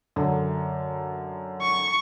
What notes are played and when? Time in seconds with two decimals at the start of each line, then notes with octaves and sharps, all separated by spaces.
0.16 F#2 D3
1.62 C#6